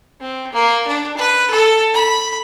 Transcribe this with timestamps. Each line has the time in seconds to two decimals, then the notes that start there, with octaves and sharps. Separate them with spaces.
0.21 C4
0.52 A#3
0.87 D4
1.17 B4
1.50 A4
1.93 B5